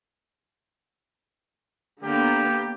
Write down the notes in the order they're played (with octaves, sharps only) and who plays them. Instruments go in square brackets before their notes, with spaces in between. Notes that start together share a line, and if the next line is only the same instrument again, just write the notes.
[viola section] D3 A#3 B3 [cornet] G4